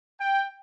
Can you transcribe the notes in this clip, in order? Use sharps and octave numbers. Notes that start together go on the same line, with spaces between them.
G5